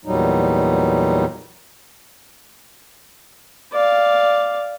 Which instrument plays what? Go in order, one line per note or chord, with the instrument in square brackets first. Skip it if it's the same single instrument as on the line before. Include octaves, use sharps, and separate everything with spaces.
[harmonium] E2 A#2 F#3 G3 D#4
[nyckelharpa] D5 F5